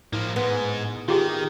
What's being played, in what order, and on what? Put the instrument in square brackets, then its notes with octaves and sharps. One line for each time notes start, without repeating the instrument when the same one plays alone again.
[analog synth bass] A2 [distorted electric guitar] F3 A#3
[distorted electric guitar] G#2 G#3 [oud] B3
[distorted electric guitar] D#3 [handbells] F4 G4 G#4